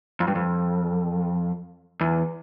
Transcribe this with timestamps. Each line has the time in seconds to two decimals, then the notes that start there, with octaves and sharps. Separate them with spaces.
0.20 F2
0.28 G2
0.35 F2
2.01 E2